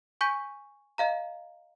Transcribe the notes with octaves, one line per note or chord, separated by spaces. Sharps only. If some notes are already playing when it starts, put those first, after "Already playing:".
G#5 C#6 G6 B6 D#7
D#5 F5 A#5